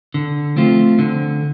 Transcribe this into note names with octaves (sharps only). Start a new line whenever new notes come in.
D3
F3 A3 C4 F4
D3